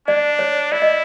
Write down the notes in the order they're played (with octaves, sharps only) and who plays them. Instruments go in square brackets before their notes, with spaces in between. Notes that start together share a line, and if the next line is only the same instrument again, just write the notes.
[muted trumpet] D4 [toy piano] D5
[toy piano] C#5
[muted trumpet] E4 [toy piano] D5
[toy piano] D#5